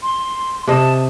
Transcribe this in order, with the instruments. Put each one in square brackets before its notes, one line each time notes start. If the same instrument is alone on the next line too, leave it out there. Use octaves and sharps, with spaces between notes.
[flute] C6
[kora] C3 D#5 [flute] A5